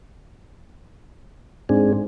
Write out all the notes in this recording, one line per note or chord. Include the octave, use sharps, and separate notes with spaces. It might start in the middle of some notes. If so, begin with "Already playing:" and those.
G#2 C4 D4 G#4